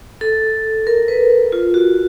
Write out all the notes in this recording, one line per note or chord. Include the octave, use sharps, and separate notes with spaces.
A4
A#4
B4
F4
F#4